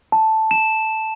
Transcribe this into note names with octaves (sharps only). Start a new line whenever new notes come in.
A5
E7